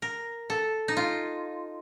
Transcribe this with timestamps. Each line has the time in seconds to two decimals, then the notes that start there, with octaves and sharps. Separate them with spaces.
0.02 A#4
0.50 A4
0.88 D#4
0.97 F4